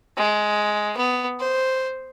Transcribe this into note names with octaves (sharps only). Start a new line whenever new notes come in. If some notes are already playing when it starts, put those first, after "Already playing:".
G#3
B3
C5